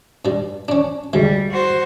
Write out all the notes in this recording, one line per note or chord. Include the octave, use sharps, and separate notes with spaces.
G2 G3
C#4 D4
D2 G3 G#3
F#4 C5